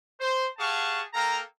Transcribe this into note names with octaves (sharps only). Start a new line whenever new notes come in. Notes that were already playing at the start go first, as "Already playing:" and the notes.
C5
G4 G#4 F5 F#5 A5 C#6
A#3 A4 F5 G5 A#5